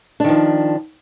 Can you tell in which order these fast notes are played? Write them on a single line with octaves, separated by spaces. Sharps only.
D4 D#3 F3